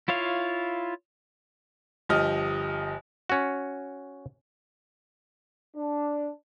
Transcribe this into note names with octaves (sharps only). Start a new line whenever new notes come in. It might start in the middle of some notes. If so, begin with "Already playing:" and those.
E4 F4 C#5 F5
G1 F3 G4 D#5 F6
C#4 F#4
D4